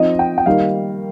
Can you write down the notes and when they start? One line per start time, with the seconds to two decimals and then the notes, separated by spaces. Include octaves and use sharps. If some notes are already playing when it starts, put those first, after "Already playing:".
Already playing: F3 C4 D#4 D#5
0.19 G5
0.38 G5
0.46 D#3 G3 A#3 D#4 F5